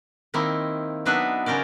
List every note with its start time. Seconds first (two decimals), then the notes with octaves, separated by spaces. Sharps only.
0.34 D#3 A#3 C4 D#4 E4
1.05 F#3 B3 D4 D#4 B4 E5
1.46 C#3 C#4 A#4 C5 D5